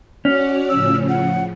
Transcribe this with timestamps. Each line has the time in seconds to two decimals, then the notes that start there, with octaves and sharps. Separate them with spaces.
0.25 C#4 F#4 D5 F#5
0.70 A2 C#3 F3 E6
1.09 F#5